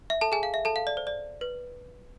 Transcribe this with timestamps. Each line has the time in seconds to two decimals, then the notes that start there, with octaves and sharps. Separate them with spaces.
0.10 E5
0.21 A4 A5
0.32 G#4 G#5
0.43 F5
0.54 E5
0.65 A4 A5
0.76 F5
0.87 D5
0.97 C5
1.07 D5
1.41 B4